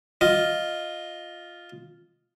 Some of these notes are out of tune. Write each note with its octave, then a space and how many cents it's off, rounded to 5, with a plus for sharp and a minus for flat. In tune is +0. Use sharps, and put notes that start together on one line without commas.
F4 +0 D#5 +0